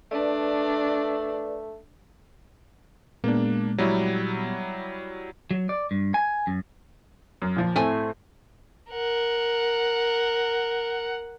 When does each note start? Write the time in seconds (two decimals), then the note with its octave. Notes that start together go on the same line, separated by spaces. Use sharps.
0.11 A3 D4 B4 D5
3.24 A#2 G#3 A#3 B3 D4
3.78 F#3 G3 E4
5.51 F#3
5.69 D5
5.91 G2
6.14 G#5
6.47 F#2
7.42 F#2
7.56 A#2 F3
7.76 A2 A3 C4 G#5
8.91 A#4 F#5